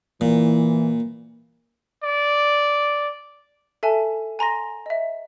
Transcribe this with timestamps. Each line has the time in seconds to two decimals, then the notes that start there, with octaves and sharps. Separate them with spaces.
0.21 A#2 E3
2.03 D5
3.83 A4 E5 G#5 A5
4.39 G#5 A#5 C6 A#6
4.86 D#5 E5